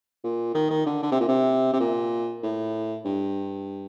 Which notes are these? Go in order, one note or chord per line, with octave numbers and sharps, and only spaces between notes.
A#2
D#3
D#3
D3
D3
C3
A#2
C3
C3
A#2
A2
G2